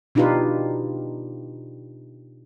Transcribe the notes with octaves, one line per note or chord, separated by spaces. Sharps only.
B2 D4 D#4 F4 G4 B4